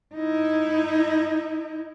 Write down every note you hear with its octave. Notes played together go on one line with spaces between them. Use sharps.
D#4 E4